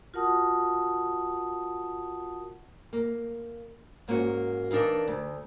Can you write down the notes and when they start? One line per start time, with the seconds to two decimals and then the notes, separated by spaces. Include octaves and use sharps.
0.14 F4 F#4 A#4 F#5 A5 D#6
2.93 A#3
4.08 G#2 A#3 C#4 F#4
4.71 E3 D4 D#4 A#4 F5
5.08 D2